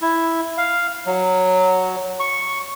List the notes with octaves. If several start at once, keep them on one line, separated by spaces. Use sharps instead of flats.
E4
F5
F#3
C#6